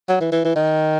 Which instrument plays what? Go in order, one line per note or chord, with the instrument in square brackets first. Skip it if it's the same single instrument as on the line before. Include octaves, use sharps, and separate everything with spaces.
[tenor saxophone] F#3
E3
E3
E3
D#3